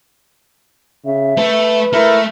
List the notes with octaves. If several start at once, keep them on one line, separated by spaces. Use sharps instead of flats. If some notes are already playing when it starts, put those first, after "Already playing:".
C#3 E5
A3 A4 B4
A3 E4 A#4